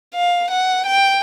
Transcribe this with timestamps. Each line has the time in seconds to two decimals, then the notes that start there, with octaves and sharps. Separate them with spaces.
0.14 F5
0.51 F#5
0.86 G5